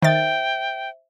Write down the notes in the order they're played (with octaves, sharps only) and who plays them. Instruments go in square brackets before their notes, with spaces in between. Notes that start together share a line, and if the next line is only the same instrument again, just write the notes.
[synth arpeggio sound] D#3 A6 [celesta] C5 E5 [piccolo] G5